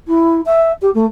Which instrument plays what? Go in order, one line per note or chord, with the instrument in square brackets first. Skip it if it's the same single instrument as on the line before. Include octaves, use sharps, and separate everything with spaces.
[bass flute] E4
E5
G4
A3